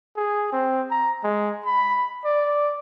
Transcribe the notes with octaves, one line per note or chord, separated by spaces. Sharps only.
G#4
C4
A#5
G#3
B5
D5